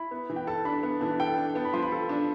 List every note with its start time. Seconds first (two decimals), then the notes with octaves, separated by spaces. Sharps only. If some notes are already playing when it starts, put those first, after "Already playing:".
Already playing: E4 B5
0.11 B3
0.30 E3
0.36 G5
0.47 A4 A5
0.65 D4 B5
0.83 B3 B5
1.01 E3 A5
1.20 A4 G5
1.38 D4
1.55 B3 A5
1.65 B5
1.73 F3 C6
1.82 B5
1.92 A4
2.09 D4